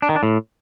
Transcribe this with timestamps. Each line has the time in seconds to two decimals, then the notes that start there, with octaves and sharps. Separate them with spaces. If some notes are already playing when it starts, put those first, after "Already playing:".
0.02 D4
0.09 D#3
0.16 D4
0.23 A2